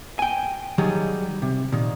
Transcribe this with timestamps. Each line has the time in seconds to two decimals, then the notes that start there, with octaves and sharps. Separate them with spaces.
0.19 G5 G#5
0.78 D#3 F#3 G3 G#4
1.42 C3
1.72 A#2 D#3